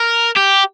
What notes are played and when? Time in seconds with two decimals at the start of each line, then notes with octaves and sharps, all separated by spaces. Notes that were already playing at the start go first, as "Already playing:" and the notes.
Already playing: A#4
0.36 G4